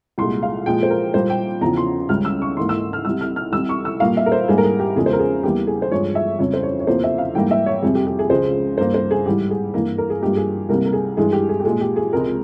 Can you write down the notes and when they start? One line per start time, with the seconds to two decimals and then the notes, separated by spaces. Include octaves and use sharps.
0.18 C2 A#2 G#3 C6
0.43 F5
0.66 A#2 F3 G#3 G5
0.83 C5
0.90 A#4
1.14 A#2 G3 A#3 C5
1.30 G5
1.61 E2 C#3 F3 A#5
1.77 C6
2.09 C#2 C#3 G3 F6
2.25 E6
2.42 C#6
2.57 G#2 E3 A#3 C6
2.69 E6
2.93 F6
3.05 C2 C3 G3 E6
3.21 F6
3.36 F6
3.52 C2 C3 G3 E6
3.69 C#6
3.85 E6
4.00 A#2 G3 A#3 F5
4.17 E5
4.26 A#4
4.32 C5
4.48 G#2 G3 A#3 G#4
4.58 A#4
4.64 G#4
4.79 G4
4.96 E2 C#3 F3 G#3 G#4
5.06 C5
5.13 A#4
5.19 G#4
5.43 E2 E3 G3 A#3 G4
5.67 G#4
5.82 C5
5.91 G2 F3 G#3 C#5
6.15 E5
6.39 F2 C#3 G3 C#5
6.54 C5
6.63 C#5
6.80 C#5
6.87 E2 C3 F3 A#3 C5
7.04 E5
7.18 F5
7.35 G#2 E3 G3 A#3 G5
7.51 E5
7.66 C#5
7.82 F2 C3 G3 G#4
7.95 G4
8.07 G4
8.19 G#4
8.30 C#2 C#3 F3 G#3 C5
8.78 G2 G3 A#3 C5
8.94 C5
9.11 G#4
9.25 G#2 E3 G3 G4
9.50 G#4
9.74 G2 E3 A#3
9.98 A#4
10.10 G#4
10.22 G2 F3 A#3 G4
10.36 G#4
10.69 C2 C3 G3 A#3 A#4
10.85 A#4
10.93 G#4
11.17 G2 E3 G#3 G#4
11.32 G4
11.49 G#4
11.60 G4
11.65 A#2 G#3 G#4
11.81 G4
11.96 G#4
12.13 C#2 C3 F3 G#3 A#4